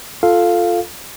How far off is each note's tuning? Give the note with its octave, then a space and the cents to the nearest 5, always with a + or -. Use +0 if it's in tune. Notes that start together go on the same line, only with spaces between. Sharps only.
F4 +0 A4 +0 F5 +0